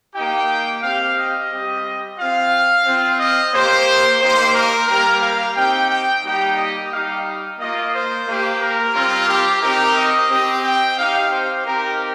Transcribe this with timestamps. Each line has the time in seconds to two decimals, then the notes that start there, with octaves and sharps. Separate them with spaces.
0.15 A#3 D#4 G4 G5
0.83 C4 G4 F5
1.17 D#5
1.51 G3 C4 G4
2.19 C4 F4 F5
2.85 C4 F4
3.19 D#5
3.53 A#3 G4 C5
4.21 A#3 D#4 G4 C5
4.55 A#4
4.88 G3 A#3 G4 A#4
5.22 F5
5.56 C4 D#4 G4 G5
5.90 G5
6.24 G3 A#3 D#4 G4 G5
6.58 D#5
6.91 G3 D#4 G4 F5
7.59 A#3 F4 D#5
7.93 C5
8.27 A#3 G4
8.61 A#4
8.95 G3 C4 F4
9.28 G4
9.62 C4 D#4 G4 A#4
9.97 D#5
10.30 C4 G4
10.63 G5
10.97 C4 D#4 G4 F5
11.31 C5
11.65 C4 D#4 G4 A#4